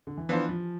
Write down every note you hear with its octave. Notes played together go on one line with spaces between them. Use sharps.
D3
E3
E3 F3 B3 D4 F4 C5
F3